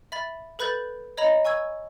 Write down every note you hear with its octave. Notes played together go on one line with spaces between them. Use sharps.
E5 B5 A6
A4 B4 B5 F#6 G6 A6
C#5 D#5 A#5 B5 F7
G#5 C#6 E6 G#6